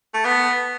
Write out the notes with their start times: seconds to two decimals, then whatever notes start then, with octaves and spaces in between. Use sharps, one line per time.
0.14 A3
0.24 B3